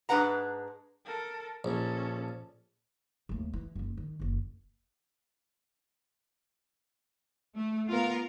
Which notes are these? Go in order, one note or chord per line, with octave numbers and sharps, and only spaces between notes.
G#2 G#3 D4 B4 F#5 A#5
A4 A#4
A#1 C#4 A4
D#2 A3
E3
F#1 F4
D#3
F#1 D#2
A3
B3 F4 A#4